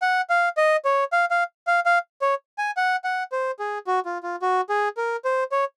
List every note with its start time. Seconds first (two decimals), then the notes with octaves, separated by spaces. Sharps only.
0.02 F#5
0.30 F5
0.57 D#5
0.85 C#5
1.12 F5
1.31 F5
1.67 F5
1.86 F5
2.22 C#5
2.58 G#5
2.77 F#5
3.04 F#5
3.32 C5
3.59 G#4
3.87 F#4
4.05 F4
4.23 F4
4.42 F#4
4.69 G#4
4.97 A#4
5.25 C5
5.52 C#5